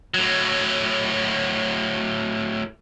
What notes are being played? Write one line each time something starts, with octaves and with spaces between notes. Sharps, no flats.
A2 F#3